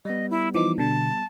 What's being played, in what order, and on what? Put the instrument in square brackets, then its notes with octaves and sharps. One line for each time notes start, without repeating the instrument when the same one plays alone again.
[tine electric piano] G3 B3 [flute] D#5
[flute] E4
[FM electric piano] E3 F3 D#4 [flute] D6
[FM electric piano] B2 D3 [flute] A5